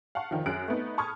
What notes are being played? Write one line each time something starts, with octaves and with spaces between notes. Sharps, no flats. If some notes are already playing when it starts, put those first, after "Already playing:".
F5 F#5 A5 C#6
F1 D#3 F3
F#2 G#4 F#6 D7
A3 B3 D#4
A5 B5 C#6 D#6 F6 G#6